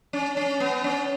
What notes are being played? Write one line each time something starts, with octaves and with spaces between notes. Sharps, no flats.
C#4
C#4
B3
C#4